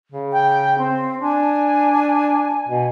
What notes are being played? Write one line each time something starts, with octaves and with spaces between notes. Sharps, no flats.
C#3
G5
C4
D4 G#5
B2